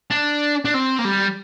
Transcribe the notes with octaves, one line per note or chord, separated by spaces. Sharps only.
D4
D4
C4
A#3
G3